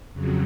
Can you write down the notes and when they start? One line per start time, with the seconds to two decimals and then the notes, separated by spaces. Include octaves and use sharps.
0.13 F2 C#3 F#3